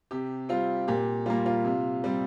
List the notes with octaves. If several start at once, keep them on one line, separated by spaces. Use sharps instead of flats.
C3 G4
G3 C4 F4
A#2 G4
G3 A#3 F4
F4
C3
G3 C4